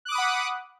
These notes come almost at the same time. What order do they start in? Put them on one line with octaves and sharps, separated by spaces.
F#6 D6 D#6 B5 F#5